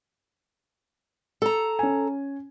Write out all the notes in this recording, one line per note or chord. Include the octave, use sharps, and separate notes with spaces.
A4 A#5
C#4 G#5